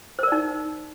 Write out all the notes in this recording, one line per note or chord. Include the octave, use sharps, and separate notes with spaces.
D#4 A#4 C5 D5